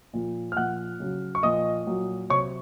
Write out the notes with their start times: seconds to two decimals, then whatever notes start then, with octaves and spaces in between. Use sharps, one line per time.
0.13 A#2 F3
0.52 F6
0.57 A#2 F3 F#5 F#6
1.00 C#3 F#3
1.35 C#6
1.43 A#2 F3 D#5 D#6
1.86 A#2 F#3
2.30 C3 F#3 C#5 C#6